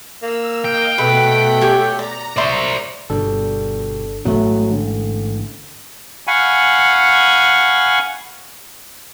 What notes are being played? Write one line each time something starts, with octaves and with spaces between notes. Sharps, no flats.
A#3 E6
D#5 F5 G5
B2 A3 B4 F#5 B6
G4 C#5 G#5
D5 A#5
C5 D5 E5 C6 C#6
G1 B2 G3 D4 A4
A1 G#2 F#3 A3 B3
D3
F5 F#5 G#5 B5 C#6